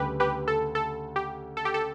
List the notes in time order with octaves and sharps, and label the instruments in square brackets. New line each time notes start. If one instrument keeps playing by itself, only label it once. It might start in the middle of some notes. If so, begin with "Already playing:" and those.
Already playing: [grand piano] D2 C#3 G3 C#4 [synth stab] G4 B4
[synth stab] G4 B4
A4
A4
G4
A4
G4
A4